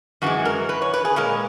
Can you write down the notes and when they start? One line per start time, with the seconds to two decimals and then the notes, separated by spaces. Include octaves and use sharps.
0.22 F#2 E3 G#3 F#4
0.45 A#4
0.69 B4
0.82 C#5
0.94 B4
1.05 G#4
1.16 A#2 G#3 A#4